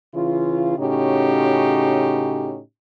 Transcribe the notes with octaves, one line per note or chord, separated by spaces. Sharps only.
C#3 E3 E4 F4
A2 C#3 C#4 D#4 F#4 G4